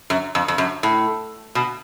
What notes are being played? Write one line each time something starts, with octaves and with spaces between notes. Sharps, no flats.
F#2
F2
F2
F#2
A2
B2